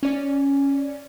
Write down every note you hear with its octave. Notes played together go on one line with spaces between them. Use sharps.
C#4 D5